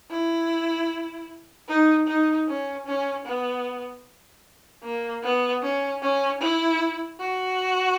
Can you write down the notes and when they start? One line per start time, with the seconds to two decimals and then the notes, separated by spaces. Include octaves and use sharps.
0.11 E4
1.68 D#4
2.07 D#4
2.48 C#4
2.87 C#4
3.26 B3
4.83 A#3
5.23 B3
5.62 C#4
6.02 C#4
6.41 E4
7.20 F#4